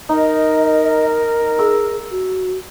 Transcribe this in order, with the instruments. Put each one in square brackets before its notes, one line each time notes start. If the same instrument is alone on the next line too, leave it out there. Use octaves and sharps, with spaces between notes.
[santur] D#4 [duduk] A#4 [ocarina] D#5
[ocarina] G#4 [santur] E6
[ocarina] F#4